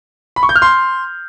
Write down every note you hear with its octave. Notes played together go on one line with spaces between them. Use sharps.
B5
C#6
G6
F6
C6